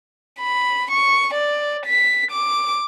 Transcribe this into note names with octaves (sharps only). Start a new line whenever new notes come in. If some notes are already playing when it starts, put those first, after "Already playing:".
B5
C#6
D5
B6
D6